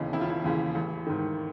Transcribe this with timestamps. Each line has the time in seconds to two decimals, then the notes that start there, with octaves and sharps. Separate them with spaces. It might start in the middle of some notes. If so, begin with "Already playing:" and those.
Already playing: E1 D#2 C#3 E3 D#4
0.13 E1 E4
0.21 F4
0.29 E4
0.44 D#2 C#3 E3
0.75 A1
1.07 G#2 D#3